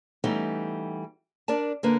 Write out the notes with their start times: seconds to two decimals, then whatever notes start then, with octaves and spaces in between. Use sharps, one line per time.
0.24 E3 G3 A3 B3 C#4 D#4
1.48 D4 A#4 D5 A5
1.83 D3 A#3 B4